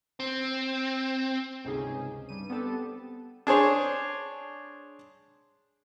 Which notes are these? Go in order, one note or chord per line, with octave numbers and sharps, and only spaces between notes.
C4
G1 C#2 C3 C#4 D#4 G#4
G2 G3 D#7
B3 C4 D4 G4 A4 A5
D4 G#4 C5 C#5